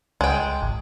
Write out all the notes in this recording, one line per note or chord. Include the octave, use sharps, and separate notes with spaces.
C#2 G#3 G5
G#1